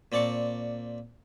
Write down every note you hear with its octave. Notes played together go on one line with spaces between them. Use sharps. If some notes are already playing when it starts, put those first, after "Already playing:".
A#2 C4 D5 A5 C#6